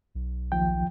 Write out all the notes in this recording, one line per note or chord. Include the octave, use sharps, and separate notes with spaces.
B1
D#2 F3 G5